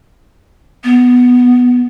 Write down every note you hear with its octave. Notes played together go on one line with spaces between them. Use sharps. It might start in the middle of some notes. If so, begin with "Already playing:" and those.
B3